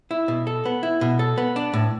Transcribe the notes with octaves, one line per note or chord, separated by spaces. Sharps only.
E4
B2
A4
B3
E4
B2
A4
B3
D4
A2